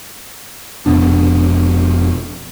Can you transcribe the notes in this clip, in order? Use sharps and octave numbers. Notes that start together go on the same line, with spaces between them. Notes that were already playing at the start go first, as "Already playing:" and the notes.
F1 F2 B2 D4